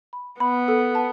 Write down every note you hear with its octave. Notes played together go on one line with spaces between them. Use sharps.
B5
B3 B5
A4
A5